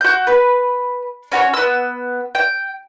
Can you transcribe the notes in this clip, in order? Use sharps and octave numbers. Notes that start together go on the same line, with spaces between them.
F#4 G6
B4
C#4 F#4 A#4 C#5
B3 E6
G5